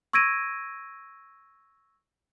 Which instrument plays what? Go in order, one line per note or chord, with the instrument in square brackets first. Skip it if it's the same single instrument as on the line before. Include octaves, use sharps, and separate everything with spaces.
[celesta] C#6 E6 G#6 A#6 D7 D#7